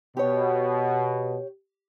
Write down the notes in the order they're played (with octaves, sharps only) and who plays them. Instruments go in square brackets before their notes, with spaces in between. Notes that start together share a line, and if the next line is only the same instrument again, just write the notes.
[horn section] B2 [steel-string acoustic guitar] G4 C#5